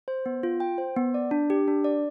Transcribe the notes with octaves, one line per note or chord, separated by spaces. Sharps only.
C5
B3
F4
G5
C5
B3
D5
D4
G4
D4
D5